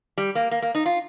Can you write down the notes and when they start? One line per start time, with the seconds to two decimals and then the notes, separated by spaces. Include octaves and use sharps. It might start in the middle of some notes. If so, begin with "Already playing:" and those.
0.18 G3
0.35 A#3
0.51 A#3
0.62 A#3
0.75 D#4
0.86 F4